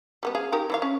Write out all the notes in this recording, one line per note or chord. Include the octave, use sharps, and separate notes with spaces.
G3 A#3 B3
G#4 F5
D#4 G4 A#4
E3 C4 F5
C#4